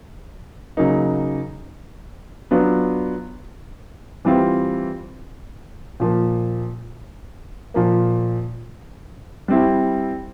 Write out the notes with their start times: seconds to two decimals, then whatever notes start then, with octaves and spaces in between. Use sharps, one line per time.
0.77 C#3 F#3 A#3 D#4
2.51 F#3 B3 D4 F4
4.25 E3 G3 C4 F4
6.00 A#2 F3 A#3
7.74 A#2 F3 A#3
9.48 G3 C4 E4